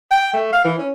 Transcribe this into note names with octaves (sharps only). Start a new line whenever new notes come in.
G5
A3
F5
E3
C#4